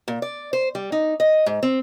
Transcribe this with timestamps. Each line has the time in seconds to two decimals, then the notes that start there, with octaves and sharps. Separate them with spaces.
0.08 A#2
0.22 D5
0.53 C5
0.75 G3
0.92 D#4
1.20 D#5
1.46 G#2
1.63 C4